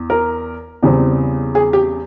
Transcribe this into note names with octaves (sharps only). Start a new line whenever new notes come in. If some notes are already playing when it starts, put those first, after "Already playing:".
Already playing: E2
A#4
E2 C#3 G3 C4
G#4
G4